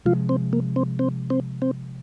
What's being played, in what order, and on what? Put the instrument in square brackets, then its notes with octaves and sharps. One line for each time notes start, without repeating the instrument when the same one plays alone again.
[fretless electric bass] C3 F3 G#3 [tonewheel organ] F4
[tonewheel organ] C4
A#3
C4
C4
C4
C4